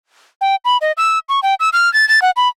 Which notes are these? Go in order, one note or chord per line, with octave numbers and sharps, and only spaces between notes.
G5
B5
D#5
E6
C#6
G5
E6
F6
A6
A6
F#5
B5